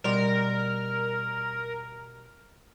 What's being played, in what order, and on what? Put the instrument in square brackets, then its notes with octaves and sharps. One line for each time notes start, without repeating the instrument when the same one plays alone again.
[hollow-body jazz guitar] B2 G3 C6 [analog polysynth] A#4